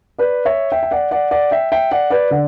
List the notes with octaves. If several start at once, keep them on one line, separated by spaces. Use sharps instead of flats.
B4 D5
C#5 E5
E5 G5
G5
D5 F#5
D5 F#5
D5 F#5
E5 G5
E5 G5
D5 F#5
B4 D5
D3 D5 F#5